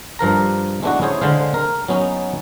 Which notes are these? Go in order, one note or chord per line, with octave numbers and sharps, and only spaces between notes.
G2 F3 A#4 A#5
G#3 A3 B3 D4 E4 F#4
C#4 E4 G#4 C5 C#5
D3 G#3 C5 F5
A#4
F#3 B3 C#4 D#4